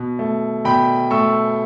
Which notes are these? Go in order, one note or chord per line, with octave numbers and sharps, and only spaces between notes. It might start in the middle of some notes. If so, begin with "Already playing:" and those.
Already playing: B2
A3
B2 G5 B5
A3 C#6 E6